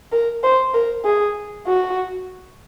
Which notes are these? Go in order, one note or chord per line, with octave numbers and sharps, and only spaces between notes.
A#4
C5
A#4
G#4
F#4